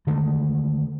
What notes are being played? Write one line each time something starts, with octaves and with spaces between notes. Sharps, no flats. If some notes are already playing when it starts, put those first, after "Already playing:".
D3 D#3 G#3 A3